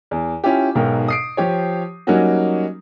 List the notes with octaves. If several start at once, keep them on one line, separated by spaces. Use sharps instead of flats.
E2
C#4 E4 F4 G4
B1 G#2 B2 A#4 G5
D#6 C7 D7
F3 G4 C#5
F#3 G3 A#3 C#4 D#4 F#4